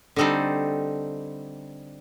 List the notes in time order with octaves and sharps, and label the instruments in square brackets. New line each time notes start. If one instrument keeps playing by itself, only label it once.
[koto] D3 G3 C4 D#4 A4